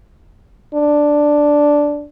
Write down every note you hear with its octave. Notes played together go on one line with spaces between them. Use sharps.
D4